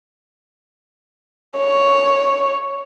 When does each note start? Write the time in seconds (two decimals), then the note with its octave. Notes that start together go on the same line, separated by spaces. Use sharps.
1.58 C#5